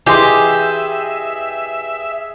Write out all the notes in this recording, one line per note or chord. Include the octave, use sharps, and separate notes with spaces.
E3 G4 G#4 D#5 E5 G#5 C6